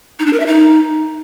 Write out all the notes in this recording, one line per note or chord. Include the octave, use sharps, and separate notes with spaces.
D#4
D4
A#4
E5
D#4